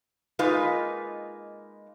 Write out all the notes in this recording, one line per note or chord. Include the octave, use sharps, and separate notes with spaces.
G#3 A#3 D#4 F4 B4